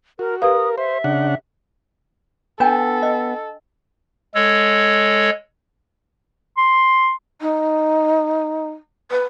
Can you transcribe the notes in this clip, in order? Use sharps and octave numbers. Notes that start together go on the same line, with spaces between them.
F#4 A#4
G4 A#4 B4 F5 D#6
C5 E5
C#3 D4 F#5
B3 D4 A4 G5 G#5
D#5
G#3 A4 C#5
C6
D#4
B4